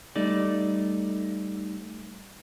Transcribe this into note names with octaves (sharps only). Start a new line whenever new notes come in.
G3 A3 D#4 D5